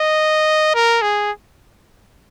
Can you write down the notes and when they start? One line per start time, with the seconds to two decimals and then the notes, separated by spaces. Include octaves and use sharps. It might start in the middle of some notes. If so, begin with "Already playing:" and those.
Already playing: D#5
0.74 A#4
1.02 G#4